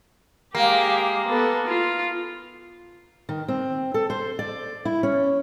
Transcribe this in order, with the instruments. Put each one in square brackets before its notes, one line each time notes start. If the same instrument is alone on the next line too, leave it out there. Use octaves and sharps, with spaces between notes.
[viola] G#3 G4 [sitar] A#3
[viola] B3 A4
F4
[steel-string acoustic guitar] D#3
C4
A4
C5
D5
E4
C#4